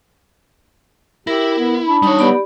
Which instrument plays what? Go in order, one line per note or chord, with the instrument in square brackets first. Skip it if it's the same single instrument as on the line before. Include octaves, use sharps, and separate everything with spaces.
[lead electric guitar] E4 [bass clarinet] G4 [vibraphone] A#4
[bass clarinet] B3
[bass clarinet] D4 [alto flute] B5
[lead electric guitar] G3 C#5 [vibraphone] D#4 D#6
[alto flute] B3 [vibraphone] G4 D5 B5